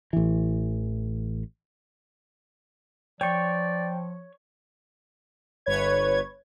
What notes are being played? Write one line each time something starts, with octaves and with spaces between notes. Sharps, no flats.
A1 E3
F3 C#5 D5 G5 C#6
G1 B4 C#5 G#6